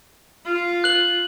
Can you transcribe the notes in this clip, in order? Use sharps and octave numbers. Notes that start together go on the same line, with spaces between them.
F4
F#6 F#7